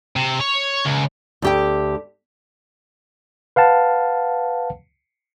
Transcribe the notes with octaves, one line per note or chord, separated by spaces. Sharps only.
C3
C#5
C#2
D2 G4 G5
B4 F5 F#5 A5